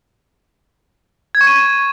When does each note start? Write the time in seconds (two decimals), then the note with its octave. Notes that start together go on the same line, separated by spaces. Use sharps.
1.35 G#6
1.41 C#6
1.47 D#7